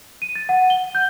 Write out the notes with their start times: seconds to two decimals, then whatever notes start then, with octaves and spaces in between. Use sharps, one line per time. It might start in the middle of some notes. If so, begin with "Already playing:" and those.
0.22 D#7
0.35 A6
0.49 F#5
0.70 G7
0.95 G6